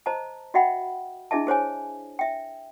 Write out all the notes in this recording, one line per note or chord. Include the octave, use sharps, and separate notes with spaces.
C5 D#5 A5 A#5
F#4 D#5 E5 F#5 G5 B5
D4 E4 G#4 D#5 E5 A5
G#4 C5 C#5 G#5
E5 G5